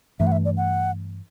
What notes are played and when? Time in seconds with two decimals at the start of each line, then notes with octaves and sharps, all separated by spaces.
0.20 G2 E3 A3 E5
0.27 F#5
0.32 E5
0.45 D5
0.57 F#5